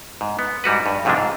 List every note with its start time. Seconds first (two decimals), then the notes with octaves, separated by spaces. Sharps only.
0.21 G#2
0.39 B3
0.64 G#2 G3 F#4 B4
0.86 G2
1.05 F2 G#2 C3 F3 G#3 D4
1.17 G#2